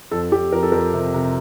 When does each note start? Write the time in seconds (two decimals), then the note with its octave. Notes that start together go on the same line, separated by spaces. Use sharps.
0.11 F2 A4
0.32 F2 G4
0.52 F2 A#4
0.62 A4
0.72 F2 A#4
0.93 C3
1.14 C3